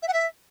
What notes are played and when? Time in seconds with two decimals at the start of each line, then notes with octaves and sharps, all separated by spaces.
0.02 E5
0.08 F#5
0.13 E5